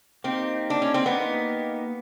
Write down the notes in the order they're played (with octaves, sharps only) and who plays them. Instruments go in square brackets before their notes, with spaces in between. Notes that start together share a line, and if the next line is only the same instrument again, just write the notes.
[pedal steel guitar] A#3 D#4 G4 [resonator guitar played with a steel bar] C4
[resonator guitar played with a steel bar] D4
C#4
C4
[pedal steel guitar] A#3 D#4 G4 [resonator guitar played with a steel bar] B3